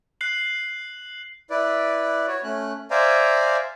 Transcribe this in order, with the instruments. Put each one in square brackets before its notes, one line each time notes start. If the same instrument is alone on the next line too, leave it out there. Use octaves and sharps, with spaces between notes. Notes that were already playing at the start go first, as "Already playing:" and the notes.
[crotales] F#6 C7 F#7
[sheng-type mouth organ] E4 B4 D5
F#4 C#5
A3 C#4 F#6
C5 D5 E5 F5 G#5 A#5